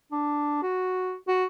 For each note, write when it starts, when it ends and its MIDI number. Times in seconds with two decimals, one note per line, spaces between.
0.12 0.62 62
0.63 1.17 66
1.28 1.45 66